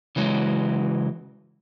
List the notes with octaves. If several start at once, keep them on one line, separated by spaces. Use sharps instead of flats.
C#3 E3 F#3 G#3